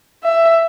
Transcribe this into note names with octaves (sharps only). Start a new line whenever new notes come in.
E5